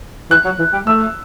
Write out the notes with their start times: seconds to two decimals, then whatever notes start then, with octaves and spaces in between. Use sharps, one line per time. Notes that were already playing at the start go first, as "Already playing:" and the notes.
0.30 E3 F#6
0.44 F#3
0.59 E3
0.73 G3
0.87 A3 E6